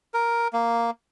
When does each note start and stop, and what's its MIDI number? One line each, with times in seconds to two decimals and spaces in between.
0.14 0.48 70
0.53 0.91 58